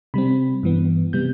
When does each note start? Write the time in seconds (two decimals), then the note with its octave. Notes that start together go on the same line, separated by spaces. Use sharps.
0.14 C3 G3 C4 B5
0.63 G2 E3 B3
1.13 C3 G3 B3 G6